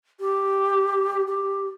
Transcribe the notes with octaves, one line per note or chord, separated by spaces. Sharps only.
G4
G4